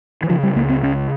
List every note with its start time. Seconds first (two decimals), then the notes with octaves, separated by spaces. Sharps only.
0.23 E3
0.29 C#3 F3
0.43 G3
0.56 C#2 A#3
0.69 C4
0.83 C#3 C#4